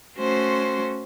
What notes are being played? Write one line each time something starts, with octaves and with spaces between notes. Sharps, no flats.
A3 C#4 F#4 C5 C6